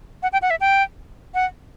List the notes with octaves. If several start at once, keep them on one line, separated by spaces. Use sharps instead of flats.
F#5
G5
F#5
E5
G5
F#5